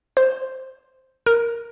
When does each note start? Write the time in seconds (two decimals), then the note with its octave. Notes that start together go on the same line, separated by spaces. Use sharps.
0.17 C5
1.26 A#4